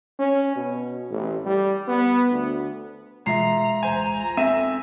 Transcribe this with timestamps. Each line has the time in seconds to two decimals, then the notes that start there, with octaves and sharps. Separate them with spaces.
0.19 C#4
0.56 B2
1.11 A1
1.46 G3
1.88 B3
2.31 D2
3.27 B2 E3 G#3 F4 E5 A#5 C7
3.83 D1 A1 C5 G#5
4.37 C4 A4 E5 G#5 E6 D#7